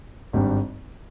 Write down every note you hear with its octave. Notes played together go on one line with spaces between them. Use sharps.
G#1 G2 G3